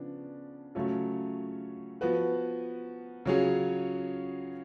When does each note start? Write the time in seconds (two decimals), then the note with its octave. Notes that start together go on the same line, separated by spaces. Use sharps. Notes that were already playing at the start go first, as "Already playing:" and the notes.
Already playing: C#3 F3 B3 D4
0.75 C#3 F#3 A3 C#4 F4
2.01 F3 B3 F#4 B4
3.26 C#3 F#3 C#4 F4 G#4